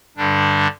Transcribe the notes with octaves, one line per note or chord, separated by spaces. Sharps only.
G2 D3 G3 D4